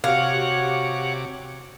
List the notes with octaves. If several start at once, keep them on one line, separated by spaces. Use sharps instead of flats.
C3 F#4 G4 C#5 F5 F#5 D6